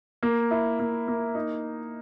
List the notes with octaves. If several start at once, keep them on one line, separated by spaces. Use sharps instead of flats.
A#3
E4
A#3
A#3
D#4